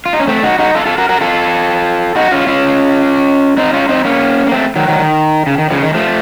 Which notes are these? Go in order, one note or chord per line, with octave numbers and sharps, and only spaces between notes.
F4
D#4
C#4
A3 C4
D#4 F#4
D#4 F#4
F4 A4
F4 A4
F#4 A#4
F#4 A#4
F4 A4
D#4 F#4
C#4 F4
C#4 F4
C4 D#4
C#4 F4
C4 D#4
A#3 C#4
A#3
A3 C4
D#3 F#3
D#3 F#3
D#3
C#3
D#3
C#3 F3
D#3
F3 A3